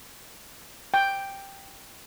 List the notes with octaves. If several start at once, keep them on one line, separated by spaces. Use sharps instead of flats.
G5